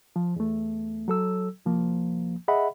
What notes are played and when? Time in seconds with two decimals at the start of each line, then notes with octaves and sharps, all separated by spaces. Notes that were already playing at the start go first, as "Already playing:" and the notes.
0.16 F3
0.36 E2 A3
1.08 F#3 A4 E6
1.66 C2 F3 A#3
2.48 G#4 D#5 E5 F#5 B5